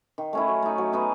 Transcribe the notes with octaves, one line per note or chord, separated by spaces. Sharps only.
D#3
A3 C#4 E4
F#3
A3 D#4
F#3
B3 D#4 G#4